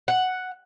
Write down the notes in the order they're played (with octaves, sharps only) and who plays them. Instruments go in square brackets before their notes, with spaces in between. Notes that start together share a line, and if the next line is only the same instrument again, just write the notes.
[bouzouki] F#5